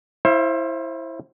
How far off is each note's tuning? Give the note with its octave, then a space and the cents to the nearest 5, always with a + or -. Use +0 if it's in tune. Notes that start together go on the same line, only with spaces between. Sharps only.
E4 +0 C5 +25 F5 -30